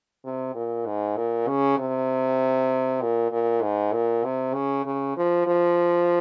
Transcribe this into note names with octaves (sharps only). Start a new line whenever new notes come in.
C3
A#2
G#2
A#2
C#3
C3
A#2
A#2
G#2
A#2
C3
C#3
C#3
F3
F3